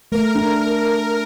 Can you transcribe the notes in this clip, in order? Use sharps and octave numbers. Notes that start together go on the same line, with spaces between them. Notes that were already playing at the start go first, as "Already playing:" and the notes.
A3 A#4
D4